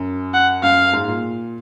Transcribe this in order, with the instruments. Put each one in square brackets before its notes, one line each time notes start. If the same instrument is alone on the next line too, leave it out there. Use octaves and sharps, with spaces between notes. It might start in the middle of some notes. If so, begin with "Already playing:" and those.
Already playing: [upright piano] F#2
[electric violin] F#5
[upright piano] F#2 [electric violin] F5
[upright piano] G#2
A#2